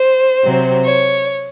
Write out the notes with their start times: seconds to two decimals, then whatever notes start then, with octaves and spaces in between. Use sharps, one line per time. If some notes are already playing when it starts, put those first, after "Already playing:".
Already playing: C5
0.43 C3 F#3 C4
0.85 C#5